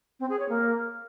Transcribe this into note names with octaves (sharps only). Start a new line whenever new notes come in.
C4
G#4
C#5
A#3